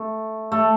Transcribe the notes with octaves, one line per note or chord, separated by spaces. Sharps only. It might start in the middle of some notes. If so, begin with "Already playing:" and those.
Already playing: A3
A3